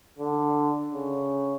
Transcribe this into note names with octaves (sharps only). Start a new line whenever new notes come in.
D3
C#3